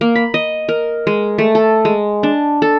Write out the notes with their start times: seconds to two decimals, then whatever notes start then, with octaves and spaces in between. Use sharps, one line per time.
0.01 A#3
0.16 B5
0.34 D#5
0.69 A#4
1.07 G#3
1.38 A3
1.55 A4
1.85 G#3
2.23 D4
2.62 A4